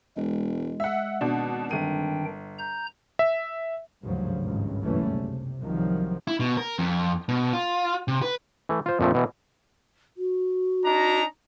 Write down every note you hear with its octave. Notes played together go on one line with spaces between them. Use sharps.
E1 G#3
E5 F#5
G#1 B2 D4 A5
G1 D#3 D4 G5 D#7
A#5 G6
E5
G#1 D2 G2 C#3 F3 F#3
G#1 C#2 G2 C#3
F#1 B1 E3 G3 A3 C#4
C3
C2 D#3 F3 F#3
E4
B2
A#4
F2
B2
F4
C3
B4
E3 A3
F4 C5
F2 A#2 F3 A3
B2 E3
F#4
D4 D#4 A#5